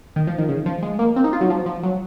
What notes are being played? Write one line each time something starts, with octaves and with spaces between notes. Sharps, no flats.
D#3
F3
D#3
C#3
F3
G#3
A#3
C4
D#4
F4
F#3
F3
F3
F#3